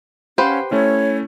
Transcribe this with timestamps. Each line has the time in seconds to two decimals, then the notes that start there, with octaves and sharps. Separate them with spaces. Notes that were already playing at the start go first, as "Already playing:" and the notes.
0.38 C#4 G4 B4 C5 F5 F#5
0.71 A3 C#4 E4 C#5